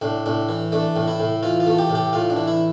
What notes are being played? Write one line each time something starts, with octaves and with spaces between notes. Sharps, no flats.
A2 D4
A2 D4
E3
A3 D4
A2
E4
A2
E3 F4
F4
A3
G4
A2
G4
A2 F4
D4
E3
E4